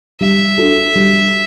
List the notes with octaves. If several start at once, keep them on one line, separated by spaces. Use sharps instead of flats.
G3 E5
D4 F#4 A4
G3